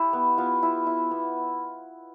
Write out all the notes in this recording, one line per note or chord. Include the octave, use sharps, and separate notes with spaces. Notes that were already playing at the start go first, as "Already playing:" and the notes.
Already playing: E4 G4
B3
B3 F4
E4
E4
B3